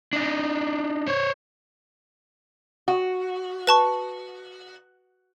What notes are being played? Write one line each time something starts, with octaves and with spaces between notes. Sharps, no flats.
D4 D#4
C5 C#5
F#4
B4 A5 C#6